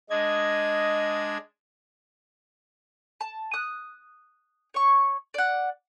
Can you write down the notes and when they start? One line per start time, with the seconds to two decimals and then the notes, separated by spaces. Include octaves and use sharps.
0.10 G#3 D4 D#5 G#6
3.21 A5
3.53 D#6 F#6
4.74 C#5 C#6
5.34 D5 F#5